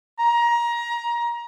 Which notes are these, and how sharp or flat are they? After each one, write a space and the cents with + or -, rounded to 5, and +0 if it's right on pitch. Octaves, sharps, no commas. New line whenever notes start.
A#5 +25